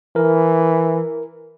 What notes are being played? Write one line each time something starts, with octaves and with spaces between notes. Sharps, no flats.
E3 A#4